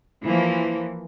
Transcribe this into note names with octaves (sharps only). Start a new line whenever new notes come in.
E3 F3 A#3